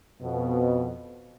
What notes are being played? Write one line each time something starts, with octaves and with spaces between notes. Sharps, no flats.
F2 B2